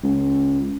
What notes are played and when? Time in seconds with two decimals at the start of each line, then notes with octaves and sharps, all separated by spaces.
0.03 C#2